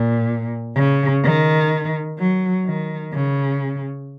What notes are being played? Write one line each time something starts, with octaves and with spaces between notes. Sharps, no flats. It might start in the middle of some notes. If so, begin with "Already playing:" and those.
Already playing: A#2
C#3
D#3
F#3
D#3
C#3